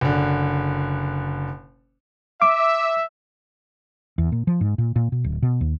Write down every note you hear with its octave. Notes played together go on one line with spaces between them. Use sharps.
F#1 D3
E5 D6
E2
A#2
F3
G#2
A#2
A#2
B2
D1
B2
D#2